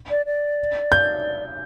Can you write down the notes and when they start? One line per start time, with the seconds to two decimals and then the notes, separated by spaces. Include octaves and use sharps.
0.10 D5
0.26 D5
0.92 G6